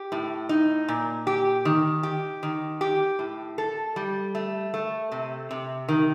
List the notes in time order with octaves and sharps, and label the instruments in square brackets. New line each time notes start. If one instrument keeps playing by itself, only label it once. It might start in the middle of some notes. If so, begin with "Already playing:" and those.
Already playing: [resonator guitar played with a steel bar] G4
A2
D#4
A#2
G4
D#3
G4
D#3
G4
A2
A4
G3
A3
A3
C3
C3
D#3